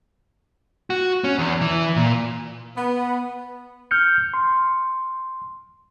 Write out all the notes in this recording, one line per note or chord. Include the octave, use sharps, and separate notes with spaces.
F#4
C#4
E2
E3
A#2
B3
F6 G6 C#7
C6